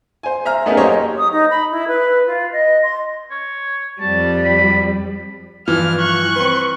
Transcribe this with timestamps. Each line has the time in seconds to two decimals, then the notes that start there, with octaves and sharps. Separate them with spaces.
0.23 C5 G#5
0.45 C5 E5 A#5 F6
0.66 A3 B3 C#4 D#4 G#4 A#4
0.77 F#3 A#3 G4 C5 C#5 D#5
1.18 D#6
1.32 D#4
1.50 B5
1.71 E4
1.88 B4
2.27 F4
2.53 D#5
2.83 C6
3.31 C#5
4.01 F2 G3 A5
4.45 B5
5.67 G2 E3 F3 F6
6.00 C#6 F#6
6.36 C4 B4